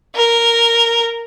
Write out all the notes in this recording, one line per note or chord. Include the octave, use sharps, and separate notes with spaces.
A#4